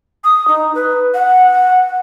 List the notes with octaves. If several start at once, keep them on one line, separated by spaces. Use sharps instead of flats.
D#6
D#4
B4
F#5